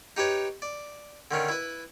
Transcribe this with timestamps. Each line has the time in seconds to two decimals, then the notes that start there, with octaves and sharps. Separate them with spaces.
0.17 D#4 G4 B4 C#5
0.62 D5
1.31 D3 D#3 C#4
1.49 E4 B4